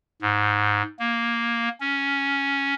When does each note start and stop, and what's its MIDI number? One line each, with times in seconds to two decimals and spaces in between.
0.22 0.82 44
0.99 1.69 58
1.80 2.74 61